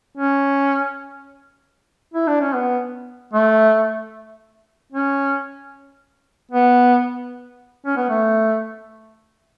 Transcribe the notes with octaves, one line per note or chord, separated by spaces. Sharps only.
C#4
E4
D4
C#4
B3
A3
C#4
B3
C#4
B3
A3